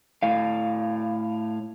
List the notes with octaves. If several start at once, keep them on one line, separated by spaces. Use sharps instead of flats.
A2 F5